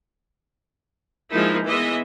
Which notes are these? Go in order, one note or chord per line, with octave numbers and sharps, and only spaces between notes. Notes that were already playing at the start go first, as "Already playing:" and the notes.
F3 G#3 A#3 D#4 E4
E3 G#3 B3 D#5 E5